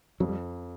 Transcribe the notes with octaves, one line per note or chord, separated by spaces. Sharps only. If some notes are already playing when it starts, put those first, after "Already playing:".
F2 F#3
G3